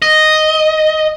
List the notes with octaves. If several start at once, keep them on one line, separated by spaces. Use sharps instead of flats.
D#5